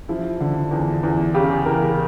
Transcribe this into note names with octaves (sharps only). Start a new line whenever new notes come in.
F3 E4
D3
E2
E2
C#3 G4
E2 A#4